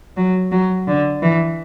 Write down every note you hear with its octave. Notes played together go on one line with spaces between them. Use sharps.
F#3
F#3
D3
E3